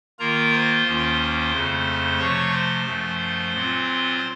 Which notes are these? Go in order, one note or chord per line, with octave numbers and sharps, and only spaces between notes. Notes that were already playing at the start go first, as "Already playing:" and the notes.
D#3 A#3 F4 A#4 A#5
C5 C6
D#2 D#3 A#3 C#4 F4
F2 C#3 A3
C3 F3 A3 C#5 C#6
C5 C6
F#2 F3 A3
A#2 F#3 C4 F4